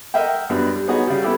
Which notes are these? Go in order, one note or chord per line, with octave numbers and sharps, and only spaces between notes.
A#4 D#5 E5 F#5 G5
F#2 F#3 G3 B3 D4
G3
B3 D#4 F#4 G#4 C#5 F#5
C#3 G3
B3 E4 G4 A4